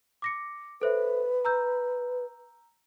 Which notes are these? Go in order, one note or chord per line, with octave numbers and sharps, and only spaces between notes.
D6 A#6 C#7
A4 B4 C5 E5
A#5 E6 G6